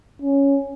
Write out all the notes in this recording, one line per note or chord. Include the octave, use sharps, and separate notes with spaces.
C#4